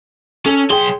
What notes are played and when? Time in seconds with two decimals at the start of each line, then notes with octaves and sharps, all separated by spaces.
0.46 C#4 A4
0.70 B1 G#4 G5 C6